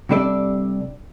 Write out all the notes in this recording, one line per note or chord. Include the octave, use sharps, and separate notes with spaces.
C3 G3 D4 A4 D5